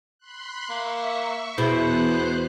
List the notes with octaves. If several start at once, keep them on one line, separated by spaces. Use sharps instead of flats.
B5 C6 F#6
A#3 E5 C#6
E2 B2 B3 E4 G#4 C5 B5 F#6